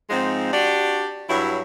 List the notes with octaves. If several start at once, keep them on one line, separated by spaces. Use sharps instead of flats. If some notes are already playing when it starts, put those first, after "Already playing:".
G#2 F3 G#3 C4 D#4
D4 F#4 G4 D5
G2 F#3 E4 C#5 E5